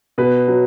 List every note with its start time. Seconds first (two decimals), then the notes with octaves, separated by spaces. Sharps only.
0.18 B2 B4
0.48 F#3